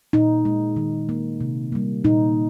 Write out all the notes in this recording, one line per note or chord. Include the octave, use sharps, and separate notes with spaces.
A#2 D#4
G#3
D#3
A#3
C3
G3 A#3
A#2 D#4